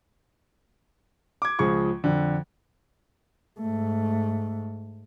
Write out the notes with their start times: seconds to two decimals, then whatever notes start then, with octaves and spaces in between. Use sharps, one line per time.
1.42 D6 G#6
1.59 C#2 F3 G#4 C#6 G#6
2.04 F2 D3
3.60 G#2 A3